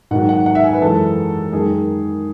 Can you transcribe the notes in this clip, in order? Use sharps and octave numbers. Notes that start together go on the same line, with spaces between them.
G#2 D#3 F#3 F#5
F#5
F#5
E5
G#5
B4
F#2 E3 G#3 A4
F#2 D#3 G#3 G#4